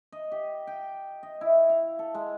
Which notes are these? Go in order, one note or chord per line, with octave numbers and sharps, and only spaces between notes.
D#5
G4
G5
D#5
E4
F5
A4
G#3